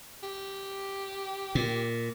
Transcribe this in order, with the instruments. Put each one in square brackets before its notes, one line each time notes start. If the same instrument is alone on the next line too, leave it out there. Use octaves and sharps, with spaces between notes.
[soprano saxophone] G4
[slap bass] A#2